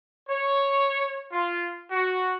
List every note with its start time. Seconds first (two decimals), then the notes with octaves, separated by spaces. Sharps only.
0.29 C#5
1.31 F4
1.91 F#4